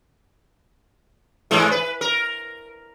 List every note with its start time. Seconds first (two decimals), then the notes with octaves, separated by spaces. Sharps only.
1.51 G#2 E3 G#3
1.71 B4
2.01 A#4